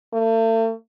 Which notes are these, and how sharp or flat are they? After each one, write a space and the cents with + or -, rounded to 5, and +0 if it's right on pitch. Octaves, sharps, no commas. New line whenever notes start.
A3 +40